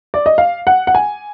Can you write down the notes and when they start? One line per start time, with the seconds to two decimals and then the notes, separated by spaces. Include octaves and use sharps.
0.14 D5
0.26 D#5
0.38 F5
0.67 F#5
0.87 F#5
0.95 G#5